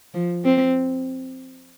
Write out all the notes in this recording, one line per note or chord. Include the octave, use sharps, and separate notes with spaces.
F3
C4